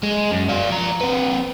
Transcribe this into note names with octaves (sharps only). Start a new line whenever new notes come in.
G#3
F#2
D5 F5
F3 A#5
C4 B4